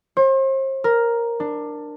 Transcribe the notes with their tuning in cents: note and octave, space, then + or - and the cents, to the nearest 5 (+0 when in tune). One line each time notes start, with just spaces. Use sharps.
C5 +40
A#4 +5
D4 +15